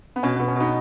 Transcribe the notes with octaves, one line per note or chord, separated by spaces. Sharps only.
B3
B2 C#4
B3
B2
C#4
B2 B3 D#4